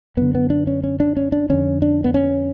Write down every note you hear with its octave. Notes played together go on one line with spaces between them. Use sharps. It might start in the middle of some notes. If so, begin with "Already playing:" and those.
F#2 D3 B3
B3
D4
C#4
C#4
D4
C#4
D4
F2 D3 C#4
D4
B3
C#4